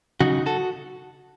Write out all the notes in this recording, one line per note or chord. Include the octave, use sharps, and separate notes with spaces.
C#3 F#3 D#4 F#4
F#4 A4